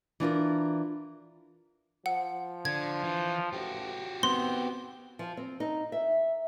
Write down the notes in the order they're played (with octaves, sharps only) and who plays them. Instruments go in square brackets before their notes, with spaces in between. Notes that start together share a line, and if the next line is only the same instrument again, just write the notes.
[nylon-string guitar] E3 D4 F4 A#4
[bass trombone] F3 [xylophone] F#5
[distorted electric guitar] D3 [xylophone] G#6
[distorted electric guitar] E3
[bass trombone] A1 [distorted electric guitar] F#4 G4
[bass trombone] D#3 [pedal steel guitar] B3 C4 [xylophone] C6
[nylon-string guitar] F3
C4
D#4
E5